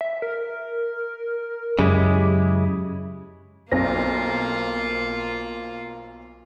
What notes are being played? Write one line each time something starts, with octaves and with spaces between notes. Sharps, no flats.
E5
A#4
F#2 C#3 G#3 E4 G4
B1 A#3 C4 F4 A#6